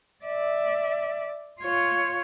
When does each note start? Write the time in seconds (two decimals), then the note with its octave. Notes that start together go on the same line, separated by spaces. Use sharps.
0.25 D5 E5
1.61 F4 C#5